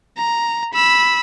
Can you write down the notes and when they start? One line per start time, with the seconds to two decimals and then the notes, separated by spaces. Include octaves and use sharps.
0.17 A#5
0.74 B5 E6